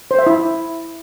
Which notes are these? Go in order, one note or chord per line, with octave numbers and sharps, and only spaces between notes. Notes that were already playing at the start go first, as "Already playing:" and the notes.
C5
E5
E4